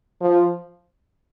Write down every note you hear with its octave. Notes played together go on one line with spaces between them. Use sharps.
F3